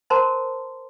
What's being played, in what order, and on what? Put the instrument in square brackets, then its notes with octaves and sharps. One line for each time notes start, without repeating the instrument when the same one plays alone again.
[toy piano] A#4 C5 A5 A#5 C6